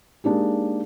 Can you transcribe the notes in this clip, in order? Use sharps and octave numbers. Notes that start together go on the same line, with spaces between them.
G#3 A#3 D4 D#4 G4